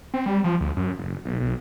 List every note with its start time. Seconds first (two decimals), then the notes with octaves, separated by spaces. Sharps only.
0.14 C4
0.26 G3
0.44 F3
0.61 D2
0.77 F#2
0.99 F#1
1.25 B1
1.40 B1